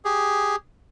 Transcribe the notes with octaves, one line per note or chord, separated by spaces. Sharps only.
G4 G#4